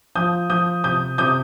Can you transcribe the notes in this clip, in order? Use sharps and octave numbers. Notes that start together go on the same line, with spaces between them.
F3 D#6 G6
F3 D#6 G6
C3 D#6 G6
C3 D#6 G6